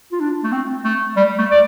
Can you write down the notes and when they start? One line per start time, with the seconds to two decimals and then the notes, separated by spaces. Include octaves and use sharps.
0.12 F4
0.20 D4
0.44 A3
0.52 C4
0.84 A3
1.16 G3
1.38 A3
1.51 D5